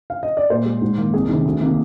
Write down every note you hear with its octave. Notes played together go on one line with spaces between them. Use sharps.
F5
D#5
D5
A#2 C5
G#3
G#2
D#3 A#3
C2 G#4
C3 D#3
D2
C3 D#3 A#3